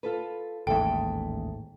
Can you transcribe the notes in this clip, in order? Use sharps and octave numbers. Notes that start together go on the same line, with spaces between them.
F4 A4 B4
A1 D#2 G#2 A4 E5 G5